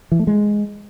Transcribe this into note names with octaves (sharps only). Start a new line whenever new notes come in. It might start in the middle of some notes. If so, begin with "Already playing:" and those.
E3
A3
G#3